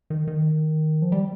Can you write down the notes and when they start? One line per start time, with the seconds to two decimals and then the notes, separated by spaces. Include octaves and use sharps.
0.10 D#3
0.27 D#3
1.02 F3
1.12 G3